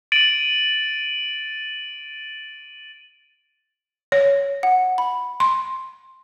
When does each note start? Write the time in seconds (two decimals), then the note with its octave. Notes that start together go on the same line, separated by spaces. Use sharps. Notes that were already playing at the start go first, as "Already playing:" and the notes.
0.12 A6 D7 D#7 F#7
4.12 C#5
4.63 F#5
4.98 B5
5.40 C6